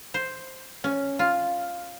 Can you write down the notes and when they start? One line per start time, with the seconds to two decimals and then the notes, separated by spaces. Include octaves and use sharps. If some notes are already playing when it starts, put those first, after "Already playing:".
0.14 C5
0.84 C#4
1.19 F4